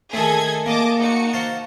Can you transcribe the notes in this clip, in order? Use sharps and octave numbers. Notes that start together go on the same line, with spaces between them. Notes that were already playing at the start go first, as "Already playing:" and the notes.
D#3 A3 G#4 A4 G#6
A#3 D#5 A5 D6
D#4 F#4 C#7
C5 F5 A5